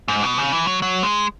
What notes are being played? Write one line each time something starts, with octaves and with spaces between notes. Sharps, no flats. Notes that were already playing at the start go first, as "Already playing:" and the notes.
G#2
B2
C#3
E3
F#3
F#3
G#3